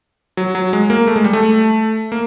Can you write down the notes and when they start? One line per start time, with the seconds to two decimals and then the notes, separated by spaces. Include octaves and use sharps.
0.37 F#3
0.55 F#3
0.73 G#3
0.90 A#3
1.07 A3
1.16 G#3
1.24 G3
1.33 A3
2.12 A#3